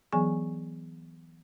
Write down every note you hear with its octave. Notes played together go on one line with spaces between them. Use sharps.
E3 F#3 B3 G#4 G#5 C#6